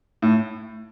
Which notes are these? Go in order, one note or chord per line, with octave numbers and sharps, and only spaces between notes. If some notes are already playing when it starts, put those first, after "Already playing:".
A2